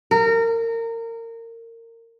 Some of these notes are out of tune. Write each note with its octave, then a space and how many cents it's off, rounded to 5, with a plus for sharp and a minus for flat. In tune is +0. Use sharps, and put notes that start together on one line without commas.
A#4 -25